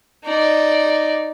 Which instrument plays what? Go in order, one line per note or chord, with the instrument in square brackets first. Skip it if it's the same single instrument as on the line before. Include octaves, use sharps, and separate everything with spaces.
[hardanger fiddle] D#4 D5